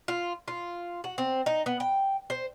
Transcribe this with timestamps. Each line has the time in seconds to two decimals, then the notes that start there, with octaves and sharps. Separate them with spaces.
0.08 F4
0.48 F4
1.04 F#4
1.18 C4
1.46 D#4
1.66 B3
1.80 G5
2.30 C5